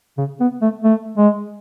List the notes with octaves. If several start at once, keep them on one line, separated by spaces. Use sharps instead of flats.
C#3
B3
A3
A3
G#3